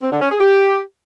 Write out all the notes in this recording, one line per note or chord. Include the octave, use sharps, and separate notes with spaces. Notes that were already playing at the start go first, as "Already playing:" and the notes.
C4
D3
C#4
G#4
G4